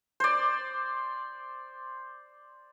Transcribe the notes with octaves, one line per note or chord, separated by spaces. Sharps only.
C5 D5